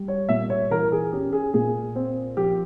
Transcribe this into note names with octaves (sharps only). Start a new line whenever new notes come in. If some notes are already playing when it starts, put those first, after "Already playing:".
Already playing: G3
C#5
A#2 E5
C#5
E3 A#4
G#4
C#4 G4
G#4
A#2 G#4
C4
F3 G4